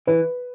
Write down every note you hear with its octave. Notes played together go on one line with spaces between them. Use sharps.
E3 B4